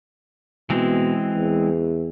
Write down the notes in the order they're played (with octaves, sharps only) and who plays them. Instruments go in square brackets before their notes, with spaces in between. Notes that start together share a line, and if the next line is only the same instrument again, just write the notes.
[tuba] B2 [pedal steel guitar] E3 G#3 C4
[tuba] E2